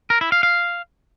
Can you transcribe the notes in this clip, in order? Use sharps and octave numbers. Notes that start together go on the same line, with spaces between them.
A#4
E4
F5
F5